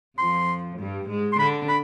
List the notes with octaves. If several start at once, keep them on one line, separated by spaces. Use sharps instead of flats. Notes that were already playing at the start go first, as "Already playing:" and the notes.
F2 F3 C6
G2 G3
G#2 G#3
C6
D3 D4 B5
B5